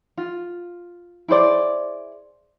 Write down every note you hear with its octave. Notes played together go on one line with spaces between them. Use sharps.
F4
E4 G#4 C5 D5